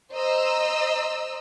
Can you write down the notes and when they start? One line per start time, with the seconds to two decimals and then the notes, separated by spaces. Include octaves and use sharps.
0.13 C5 D#5 A#5 E6